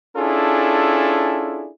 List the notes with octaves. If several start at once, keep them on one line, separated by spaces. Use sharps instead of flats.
C#4 D4 E4 F4 G#4 A4